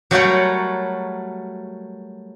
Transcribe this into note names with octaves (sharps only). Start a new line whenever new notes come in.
F#3 G3 A3 F#4 A#4 C#5